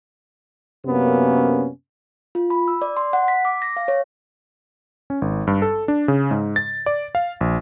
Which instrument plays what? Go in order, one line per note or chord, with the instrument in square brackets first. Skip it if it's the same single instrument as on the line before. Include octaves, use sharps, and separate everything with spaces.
[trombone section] F#2 C3 A#3 B3 C#4
[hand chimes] F4
B5
E6
D5
C6
F#5
B6
D6
A#6
F5
C#5
[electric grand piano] C#4
G#1
G2
A4
D4
C#3
G#2
A6
D5
F5
A#1